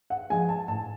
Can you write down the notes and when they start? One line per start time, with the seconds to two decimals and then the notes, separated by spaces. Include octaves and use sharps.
0.10 F#5
0.30 F3 G#3 G#5
0.49 A5
0.68 A2 A5